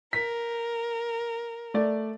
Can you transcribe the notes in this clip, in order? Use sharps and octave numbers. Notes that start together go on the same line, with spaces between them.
A#4 B6
A3 D5